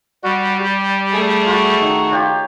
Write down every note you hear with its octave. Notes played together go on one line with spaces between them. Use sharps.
G3 F#4
G4
A3 G#4
F#4
D#3
F4 G4 C#5